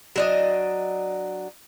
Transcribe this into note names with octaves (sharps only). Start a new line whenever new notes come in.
F#3 D4 D#5